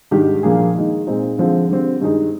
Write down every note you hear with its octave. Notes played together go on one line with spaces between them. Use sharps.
G#2 D#3 G3 D4 G4
A#2 F3 A#3 D4 G#4
D#3 G#3 D#4
A#2 G#3 C4 D#4
D3 F3 G#3 C4 F4
D3 G3 C4
G2 D#3 G#3 D#4 G#4